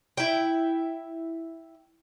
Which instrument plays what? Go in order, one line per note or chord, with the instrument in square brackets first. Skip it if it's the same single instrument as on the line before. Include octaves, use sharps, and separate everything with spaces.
[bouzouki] E4 G5